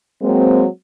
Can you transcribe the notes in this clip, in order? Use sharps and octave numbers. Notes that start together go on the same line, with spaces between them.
F#3 G#3 A#3 C4